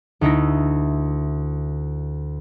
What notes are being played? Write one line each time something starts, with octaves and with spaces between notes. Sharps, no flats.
D2 D#4 E4 A#6